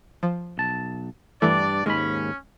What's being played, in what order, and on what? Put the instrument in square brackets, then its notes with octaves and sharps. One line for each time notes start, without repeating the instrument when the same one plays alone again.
[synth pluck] F3
[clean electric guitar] B1 A5
[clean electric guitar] G2 G3 D4 [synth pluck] E3 A3 [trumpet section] D5
[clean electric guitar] D#2 G#2 B5 [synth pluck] G#3 [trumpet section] C#4